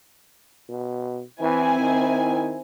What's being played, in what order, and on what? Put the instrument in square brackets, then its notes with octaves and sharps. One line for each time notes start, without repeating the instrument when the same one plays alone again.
[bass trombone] B2
[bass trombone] E3 [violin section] C4 E4 G#5
[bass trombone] D#3